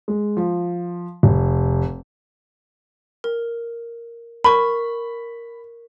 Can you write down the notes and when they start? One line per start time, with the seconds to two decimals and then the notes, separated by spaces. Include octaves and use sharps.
0.08 G#3
0.37 F3
1.23 F1
3.24 A#4
4.44 A#4 B5 C#6